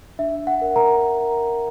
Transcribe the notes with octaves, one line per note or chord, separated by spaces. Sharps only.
D4 E5
F#5
A#4
A#4 A#5